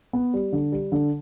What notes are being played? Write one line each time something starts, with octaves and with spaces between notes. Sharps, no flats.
B3
G3
D3
G3
D3